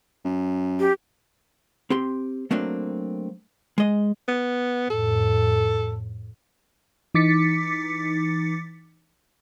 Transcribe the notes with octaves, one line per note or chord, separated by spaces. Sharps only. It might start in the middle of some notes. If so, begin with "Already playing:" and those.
F#2
G4
C4 G4 C6
F#3 A3 A#3 C4 D4
G#3 D#5
B3
F2 A2 A4
E3 D#4 D6 A6 B6 C#7